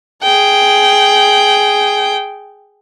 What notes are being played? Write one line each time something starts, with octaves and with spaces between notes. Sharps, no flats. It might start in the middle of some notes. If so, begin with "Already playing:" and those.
G#4 G5